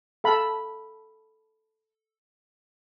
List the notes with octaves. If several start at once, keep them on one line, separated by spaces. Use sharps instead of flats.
A4 F5 B5